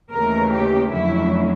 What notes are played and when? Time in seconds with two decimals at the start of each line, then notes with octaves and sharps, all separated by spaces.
0.11 D#2 C#3 E3 A3 A#4
0.52 G4
0.93 F2 D3 F#3 A3 C#4 E4